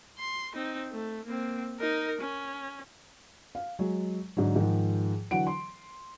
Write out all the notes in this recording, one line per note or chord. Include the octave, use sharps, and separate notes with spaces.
C6
C4 D#4
A3
A#3 C4
D#4 A#4
C#4
F5
F#3 G#3
G#2 D3 F#3
G#2 D#3 F3
D3 E3 F#3 F#5 D7
C6